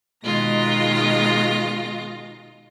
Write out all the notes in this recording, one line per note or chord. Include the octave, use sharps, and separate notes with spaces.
B2 D#3 G#3 F4 A#6